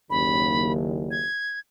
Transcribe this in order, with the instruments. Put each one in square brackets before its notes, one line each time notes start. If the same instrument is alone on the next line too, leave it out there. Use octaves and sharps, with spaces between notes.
[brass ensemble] F#1 D#2 [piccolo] B5
[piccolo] G#6